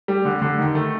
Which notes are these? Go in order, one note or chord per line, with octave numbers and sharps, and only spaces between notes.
G3
D3
D3
D#3
A3